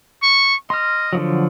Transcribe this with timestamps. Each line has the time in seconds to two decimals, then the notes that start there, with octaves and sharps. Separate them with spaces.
0.23 C#6
0.70 D#5 C6 F6
1.13 D3 F3 F#3